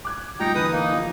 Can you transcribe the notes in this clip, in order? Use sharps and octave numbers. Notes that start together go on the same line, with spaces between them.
D6 F#6 G#6
A#2 G3 D#4 G5 A#5 C#7
D3 E3 B4 D#6
A#3 D#4
A#1